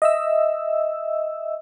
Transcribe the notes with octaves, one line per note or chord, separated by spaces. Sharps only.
D#5 E5 E6